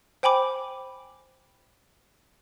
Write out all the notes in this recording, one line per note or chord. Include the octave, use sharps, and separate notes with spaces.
C5 G5 G#5 B5 D6